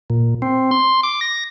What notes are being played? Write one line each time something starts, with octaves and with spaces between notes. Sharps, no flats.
A#2
C4
C6
D6
A#6